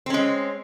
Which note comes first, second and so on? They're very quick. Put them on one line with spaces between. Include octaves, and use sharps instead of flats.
C4 C#4 G#3